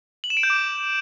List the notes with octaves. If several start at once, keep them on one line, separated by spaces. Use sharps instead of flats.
F#7
E7
D7
G6
D6